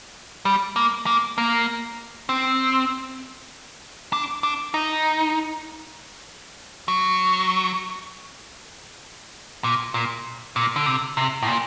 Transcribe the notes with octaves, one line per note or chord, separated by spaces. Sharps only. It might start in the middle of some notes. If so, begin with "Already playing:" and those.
G3
A#3
A#3
A#3
C4
D4
D4
D#4
F#3
A#2
A#2
A#2
D3
C3
C3
A2
A#2